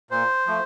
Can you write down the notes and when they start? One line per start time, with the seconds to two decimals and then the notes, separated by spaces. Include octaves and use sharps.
0.11 A#2 C5
0.46 F3 A3